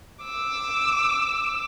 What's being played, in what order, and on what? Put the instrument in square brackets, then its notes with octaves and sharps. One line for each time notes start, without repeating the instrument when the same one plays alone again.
[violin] D6 E6